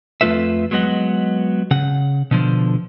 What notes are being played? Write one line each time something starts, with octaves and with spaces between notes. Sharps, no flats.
F2 A3 F4 B4 E5
F#3 G#3 B3 D#5 F#5
C#3 F#5
B2 D3 F3